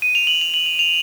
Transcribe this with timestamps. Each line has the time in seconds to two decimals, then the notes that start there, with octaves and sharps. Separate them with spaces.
0.02 D#7
0.15 F7
0.27 F#7
0.41 F7
0.54 F#7
0.66 F7
0.79 F7